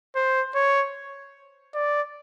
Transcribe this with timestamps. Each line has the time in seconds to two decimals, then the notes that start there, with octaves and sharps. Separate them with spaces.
0.15 C5
0.55 C#5
1.74 D5